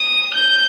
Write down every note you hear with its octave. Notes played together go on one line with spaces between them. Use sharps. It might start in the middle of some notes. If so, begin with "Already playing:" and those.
Already playing: D#6
G6